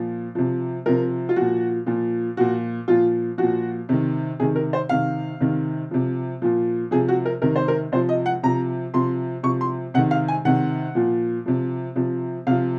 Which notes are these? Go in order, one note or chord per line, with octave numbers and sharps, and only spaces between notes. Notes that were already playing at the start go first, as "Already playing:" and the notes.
Already playing: A#2 F3
C3 F3
C3 F3 A#4
F4
A#2 F3 F#4
A#2 F3
A#2 F3 F#4
A#2 F3 F4
A#2 F3 F#4
C3 D#3
C3 D#3 G#4
A#4
C5
C3 D#3 F5
C3 D#3
C3 F3
A#2 F3
C3 F3 G#4
F#4
A#4
C3 D#3 A#4
C5
A#4
C3 F3 C5
D#5
F#5
C3 F3 A#5
C3 F3 C6
C3 F3 C#6
C6
C3 D#3 F#5
F5
G#5
C3 D#3 F#5
A#2 F3
C3 F3
C3 F3
C3 F3 F5